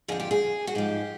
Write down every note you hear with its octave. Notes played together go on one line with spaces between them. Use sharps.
F2 D3 F3 G#4
G4
G#4
F#4
G#2 F3 G4